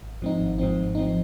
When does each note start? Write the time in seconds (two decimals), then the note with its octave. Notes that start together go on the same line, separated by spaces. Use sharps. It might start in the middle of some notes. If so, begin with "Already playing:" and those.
0.03 G#1
0.22 G#2 F3 C4 D#4
0.40 G#1
0.58 G#2 F3 C4 D#4
0.77 G#1
0.95 F3 C4 D#4